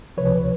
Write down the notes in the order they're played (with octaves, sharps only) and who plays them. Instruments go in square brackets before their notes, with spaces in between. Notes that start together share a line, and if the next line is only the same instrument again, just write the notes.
[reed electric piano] C#2 C3 F3 B4 C#5